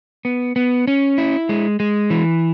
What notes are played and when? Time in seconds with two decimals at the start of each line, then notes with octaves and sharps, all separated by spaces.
0.25 B3
0.56 B3
0.87 C#4
1.18 E4
1.49 G#3
1.80 G#3
2.10 E3